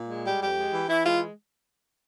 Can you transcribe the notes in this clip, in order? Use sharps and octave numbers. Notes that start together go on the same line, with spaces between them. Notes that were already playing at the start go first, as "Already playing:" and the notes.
Already playing: A#2
G#3
G3 G4
F2 G4
G#3
E3
E3 E4
G#3 F4